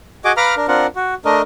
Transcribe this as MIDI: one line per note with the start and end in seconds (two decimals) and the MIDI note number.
0.25 0.32 66
0.25 0.32 68
0.25 0.32 75
0.25 0.32 86
0.37 0.55 71
0.37 0.55 77
0.37 0.55 82
0.37 0.55 83
0.37 0.55 86
0.37 0.55 89
0.57 0.66 62
0.57 0.66 70
0.68 0.86 60
0.68 0.86 62
0.68 0.86 65
0.68 0.86 70
0.68 0.86 78
0.95 1.14 66
1.25 1.42 57
1.25 1.42 62
1.25 1.42 70
1.25 1.42 75